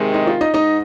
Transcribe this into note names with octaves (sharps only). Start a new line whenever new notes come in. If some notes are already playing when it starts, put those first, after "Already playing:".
Already playing: C3 D#3 G#3
D#4
F4
D#4 D#5
G#2 D#4 D#5